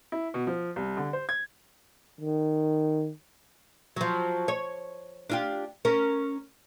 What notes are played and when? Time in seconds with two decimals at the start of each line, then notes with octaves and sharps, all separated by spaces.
0.12 E4
0.34 B2
0.47 F3
0.76 C2
0.97 D3
1.13 C5
1.29 G#6
2.20 D#3
3.96 F3 F#3
4.48 C#5
5.30 D4 F4 G4
5.85 C#4 A#4